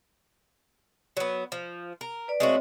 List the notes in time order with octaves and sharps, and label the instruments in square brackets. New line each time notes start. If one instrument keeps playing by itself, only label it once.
[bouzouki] F#3 B3
F3
A#4
[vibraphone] B4 D5
[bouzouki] G#3 A3 F#4 [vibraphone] C4 C#5 D#5